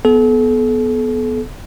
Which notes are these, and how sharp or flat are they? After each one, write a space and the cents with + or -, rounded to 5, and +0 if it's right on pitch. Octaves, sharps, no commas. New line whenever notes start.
B3 +0 A4 -40